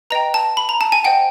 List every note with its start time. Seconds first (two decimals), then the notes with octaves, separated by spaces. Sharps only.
0.10 B4 D#5 G5 A#5
0.34 A5
0.57 B5
0.69 A#5
0.81 A5
0.92 G#5
1.04 C5 D#5 F#5 G5